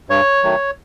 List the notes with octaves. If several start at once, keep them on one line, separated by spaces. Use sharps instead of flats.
G2 C#5
D#3 F#3 A3